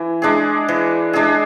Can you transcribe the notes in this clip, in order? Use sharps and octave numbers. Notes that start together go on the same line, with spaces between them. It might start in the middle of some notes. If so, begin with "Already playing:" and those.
Already playing: E3
G#3 D4 G#4
E3
G#3 D4 G#4